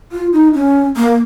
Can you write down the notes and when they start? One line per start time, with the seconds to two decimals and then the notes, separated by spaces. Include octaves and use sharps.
0.12 F4
0.33 D#4
0.54 C#4
0.97 A#3